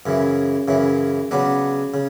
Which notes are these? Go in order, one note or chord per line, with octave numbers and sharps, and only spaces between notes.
F#2 C#3 E3
F#2 C#3 E3
C#3 F#3 B3 D4
C#3